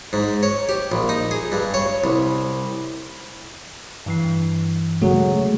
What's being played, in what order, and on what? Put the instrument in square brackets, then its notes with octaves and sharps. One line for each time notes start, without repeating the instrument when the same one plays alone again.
[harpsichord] G#2
C#5
G4
A#1
D#4
G#4
G2
C#5
C2
[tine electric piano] G2 E3 C7
[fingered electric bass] C#3 G#3 A3 [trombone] F#3 [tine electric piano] F#4 G#4